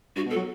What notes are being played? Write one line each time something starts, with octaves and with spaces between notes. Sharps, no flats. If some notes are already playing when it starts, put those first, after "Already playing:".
G2 F#4
B2
A4
F#3